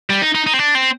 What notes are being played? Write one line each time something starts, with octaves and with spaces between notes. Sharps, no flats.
G3
D#4
D#4
D#4
C4
D4
C4